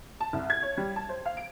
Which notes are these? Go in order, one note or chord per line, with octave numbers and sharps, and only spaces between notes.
A5
C2
G#6
C#5
G3
A5
C5
F5
D7